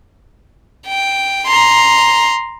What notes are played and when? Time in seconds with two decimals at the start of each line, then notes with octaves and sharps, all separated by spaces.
0.87 G5
1.46 A#5 C6